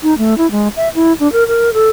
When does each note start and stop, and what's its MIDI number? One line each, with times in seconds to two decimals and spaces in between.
0.03 0.17 63
0.18 0.37 57
0.38 0.50 64
0.51 0.68 56
0.76 0.89 76
0.95 1.13 64
1.20 1.30 62
1.32 1.47 70
1.47 1.73 70
1.73 1.90 69